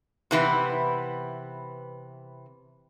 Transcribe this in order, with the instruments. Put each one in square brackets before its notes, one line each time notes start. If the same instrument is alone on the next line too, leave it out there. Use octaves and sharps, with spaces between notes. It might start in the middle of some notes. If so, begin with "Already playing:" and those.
[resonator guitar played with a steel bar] C3 E3 B3 E4